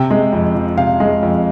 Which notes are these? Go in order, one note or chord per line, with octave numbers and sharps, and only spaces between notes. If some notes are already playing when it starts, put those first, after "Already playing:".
Already playing: C3 G5
G#3
F2
F3
C3 F5
G#3
F2